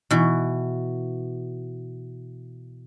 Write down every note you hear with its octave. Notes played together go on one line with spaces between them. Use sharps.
B2 E3